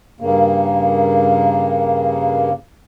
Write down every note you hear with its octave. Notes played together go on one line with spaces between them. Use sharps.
G2 C#3 A#3